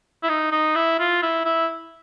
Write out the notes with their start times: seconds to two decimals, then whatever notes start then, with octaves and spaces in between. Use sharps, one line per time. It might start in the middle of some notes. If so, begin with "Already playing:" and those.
0.23 E4
0.29 D#4
0.52 D#4
0.76 E4
1.00 F4
1.22 E4
1.45 E4